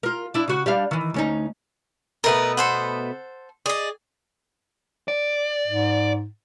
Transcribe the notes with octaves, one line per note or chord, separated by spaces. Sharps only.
F4 A#4
D4 E4
C#3 F#4
G3 D4 F5
D#3 E3
D2 C#4 D#4
B2 A3 B3 A#4 B4
A4 C5 F#5
G#4 D5 D#5
D5
G#2